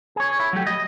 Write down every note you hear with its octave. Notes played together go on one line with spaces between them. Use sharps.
G#4 C#5
E4
F#3 A3 G4
D#5